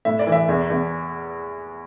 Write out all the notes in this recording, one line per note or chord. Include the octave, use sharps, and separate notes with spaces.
A2 E5
D5
E3
E5
E2
E2